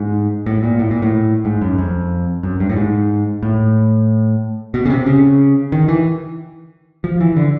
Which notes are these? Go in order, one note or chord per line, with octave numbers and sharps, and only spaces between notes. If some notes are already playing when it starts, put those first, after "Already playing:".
Already playing: G#2
A2
A#2
A2
A#2
A2
G#2
F#2
F2
F#2
G2
A2
G#2
A2
B2
C#3
C3
C#3
D#3
E3
F3
E3
D3